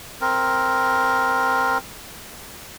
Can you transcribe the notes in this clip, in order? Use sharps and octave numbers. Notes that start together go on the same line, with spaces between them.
C4 A#4